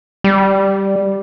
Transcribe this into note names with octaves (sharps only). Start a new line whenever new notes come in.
G3